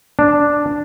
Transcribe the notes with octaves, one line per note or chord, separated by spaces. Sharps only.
D4